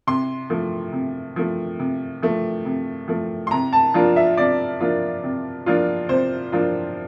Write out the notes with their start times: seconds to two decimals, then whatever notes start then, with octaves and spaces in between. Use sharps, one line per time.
0.07 C3 C6
0.50 F3 A3
0.93 C3
1.36 F3 A3
1.80 C3
2.22 F3 A3
2.65 C3
3.08 F3 A3
3.47 C6
3.51 C3 A#5
3.73 A5
3.94 F3 A#3 D4 F4
4.16 E5
4.37 C3 D5
4.80 F3 A#3 D4 F4
5.24 C3
5.66 F3 A#3 D4 F4
6.09 C3 C5
6.52 F3 A#3 D4 F4